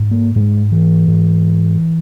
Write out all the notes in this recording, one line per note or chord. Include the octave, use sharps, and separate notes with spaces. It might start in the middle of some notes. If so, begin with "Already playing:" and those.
Already playing: G#2
A#3
G#2 G#3
E3
G#2